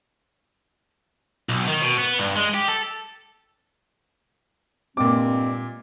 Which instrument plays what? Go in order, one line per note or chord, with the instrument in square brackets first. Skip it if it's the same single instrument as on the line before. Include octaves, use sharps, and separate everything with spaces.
[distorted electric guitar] B1
D#3
B2
B3
G2
G#3
G4
A4
[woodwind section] G2 G#3 C4 [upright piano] A#2 D6